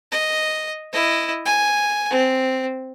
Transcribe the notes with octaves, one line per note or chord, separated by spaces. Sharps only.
D#5
E4 D#5
G#5
C4